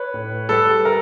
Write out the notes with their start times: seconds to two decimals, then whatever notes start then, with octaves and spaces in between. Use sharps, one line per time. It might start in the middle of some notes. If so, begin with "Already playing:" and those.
Already playing: B4 C#5
0.14 A2
0.49 G3 A4 B4
0.85 A#4